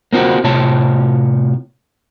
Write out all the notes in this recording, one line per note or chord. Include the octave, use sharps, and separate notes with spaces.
A#3 C4 F4 F#4
A2 C3 F4 C#5 A5